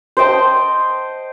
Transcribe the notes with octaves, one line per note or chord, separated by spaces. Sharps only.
C5 D#5 G5 A5